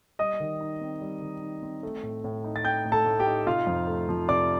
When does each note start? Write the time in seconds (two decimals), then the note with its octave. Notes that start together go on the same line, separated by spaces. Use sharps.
0.19 G3 D#5 D#6
0.40 D#3
0.61 D#4
0.81 C4
1.01 G3
1.22 D#3
1.42 D#4
1.62 C4
1.83 A3
2.03 A2
2.24 A2
2.44 D#4
2.56 A6
2.65 A3 G5 G6
2.85 A2
2.92 A4 A5
3.06 A2
3.19 G4 G5
3.26 D#4
3.47 C3 F4 F5
3.67 F2
3.87 A3
4.09 F3
4.29 C3 D5 D6